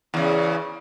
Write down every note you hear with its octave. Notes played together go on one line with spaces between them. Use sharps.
E2 C#3